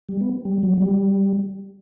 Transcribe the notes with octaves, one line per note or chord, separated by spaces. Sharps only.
G3
B3
G3
F#3
F#3
G3